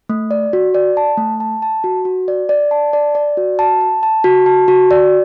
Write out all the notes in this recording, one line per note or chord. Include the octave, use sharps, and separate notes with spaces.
A3
D5
F#4
D5
A5
A3
A5
A5
F#4
F#4
D5
D5
A5
D5
D5
F#4
A5
A5
A5
F#4
A5
F#4
D5